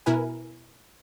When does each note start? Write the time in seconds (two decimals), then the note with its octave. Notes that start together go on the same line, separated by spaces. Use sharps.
0.06 B2 E4 A#4 B4 G#5